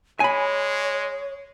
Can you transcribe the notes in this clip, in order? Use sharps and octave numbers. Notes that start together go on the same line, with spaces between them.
G#3 C#5 G#5 B5